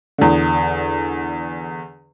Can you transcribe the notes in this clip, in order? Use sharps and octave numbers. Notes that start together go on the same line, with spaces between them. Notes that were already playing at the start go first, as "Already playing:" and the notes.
E2 D3